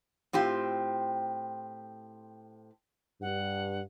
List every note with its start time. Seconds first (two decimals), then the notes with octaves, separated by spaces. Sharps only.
0.33 A2 C4 F4 G4
3.22 G2 F#5